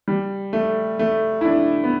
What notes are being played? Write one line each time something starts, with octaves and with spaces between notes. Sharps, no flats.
G3
A3
A3
E4
D4
B3